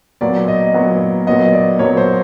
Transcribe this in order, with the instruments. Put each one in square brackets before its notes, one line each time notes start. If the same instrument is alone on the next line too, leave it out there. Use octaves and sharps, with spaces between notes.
[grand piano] A#2 F#3 B3 [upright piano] D5
[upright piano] D#5
[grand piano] A#2 F#3 B3
[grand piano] A#2 F#3 B3 [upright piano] D#5
[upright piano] D5
[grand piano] A#2 F#3 B3 [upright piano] C#5
[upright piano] C5